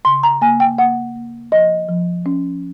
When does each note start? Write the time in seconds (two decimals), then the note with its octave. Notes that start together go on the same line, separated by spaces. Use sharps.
0.05 C#3 C6
0.23 A#5
0.41 A#3 G#5
0.60 G5
0.78 A#3 F#5
1.16 A#3
1.52 F3 D#5
1.89 F3
2.26 C#4